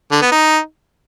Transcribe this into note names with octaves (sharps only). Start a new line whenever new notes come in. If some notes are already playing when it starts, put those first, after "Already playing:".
D3
B3
D#4